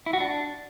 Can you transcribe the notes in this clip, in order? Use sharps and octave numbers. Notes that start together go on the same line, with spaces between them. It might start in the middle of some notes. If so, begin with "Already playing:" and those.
E4
F#4
D4